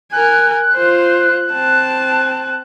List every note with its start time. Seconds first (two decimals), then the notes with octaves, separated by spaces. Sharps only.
0.12 A#4 G#5 F#6
0.74 F4 C5
1.51 C4 A5